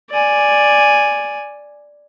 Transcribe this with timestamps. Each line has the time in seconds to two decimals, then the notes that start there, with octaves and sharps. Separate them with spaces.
0.10 D5 G#5